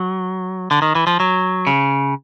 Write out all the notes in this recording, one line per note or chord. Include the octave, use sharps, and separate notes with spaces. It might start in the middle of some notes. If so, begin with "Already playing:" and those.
Already playing: F#3
D3
D#3
E3
F3
F#3
C#3